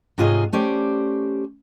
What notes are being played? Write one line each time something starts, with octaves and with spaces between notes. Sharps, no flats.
G#2 C3 F4 G#4 C#5 D#5
A3 C#4 G4 C5 D5